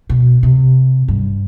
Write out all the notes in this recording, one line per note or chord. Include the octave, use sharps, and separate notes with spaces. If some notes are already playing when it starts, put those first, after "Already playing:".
B2
C3
G2